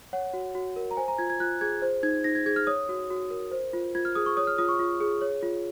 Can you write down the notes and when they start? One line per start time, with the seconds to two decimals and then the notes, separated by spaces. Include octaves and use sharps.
0.13 C#5 F#5
0.34 F#4
0.55 F#4
0.76 A#4
0.91 A#5
0.97 C5 G#5
1.08 A#5
1.18 F4 G#6
1.30 G#6
1.40 F4 F#6
1.61 G#4 G#6
1.82 C5
2.03 D#4 G#6
2.24 D#4 A#6
2.35 G#6
2.46 G#4 G#6
2.56 F6
2.67 C#5 D#6
2.89 F#4
3.10 F#4
3.31 A#4
3.51 C5
3.73 F4
3.95 F4 G#6
4.05 F6
4.15 G#4 D#6
4.26 C#6
4.37 C#5 D#6
4.47 F6
4.58 F4 D#6
4.69 C#6
4.79 F4
5.00 G#4
5.22 C#5
5.43 F4